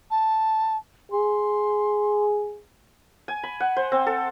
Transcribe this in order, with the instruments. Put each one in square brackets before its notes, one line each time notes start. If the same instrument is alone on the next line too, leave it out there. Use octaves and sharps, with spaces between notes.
[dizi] A5
[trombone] G#4 [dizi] C6
[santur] G#5
B5
F#5
C5
C4
A4